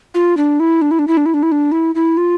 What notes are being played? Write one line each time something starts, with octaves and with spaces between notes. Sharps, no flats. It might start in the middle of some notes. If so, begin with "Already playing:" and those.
F4
D4
E4
D4
E4
D4
E4
D4
E4
D4
E4
D4
E4
E4
F4